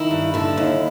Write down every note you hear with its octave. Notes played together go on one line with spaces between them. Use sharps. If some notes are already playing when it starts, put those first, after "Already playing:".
Already playing: D#3 E4
G2
D3 E4
D#2